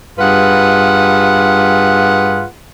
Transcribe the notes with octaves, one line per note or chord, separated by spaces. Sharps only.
G2 F4 G#4 B4 F#5